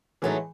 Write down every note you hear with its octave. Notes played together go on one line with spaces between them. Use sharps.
A2 E3 F#3 G#3 A3 D#4